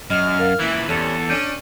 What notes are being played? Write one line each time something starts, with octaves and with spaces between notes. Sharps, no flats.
F#2 D#5 F6
A#4 F5
A#2 E3 E4 F#6
E2 C3 G3 C#4 A4
C#4 D4 G6 D7 D#7